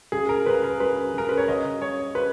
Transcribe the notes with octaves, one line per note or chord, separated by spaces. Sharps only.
C#3 G#4
A#4
C#2 B4
A#4
C#3 B4
C#3 A#4
B4
C#5
C#3 D#5
C#3 C#5
C#3 B4